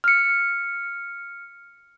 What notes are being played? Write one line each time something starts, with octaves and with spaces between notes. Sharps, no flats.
F6 C#7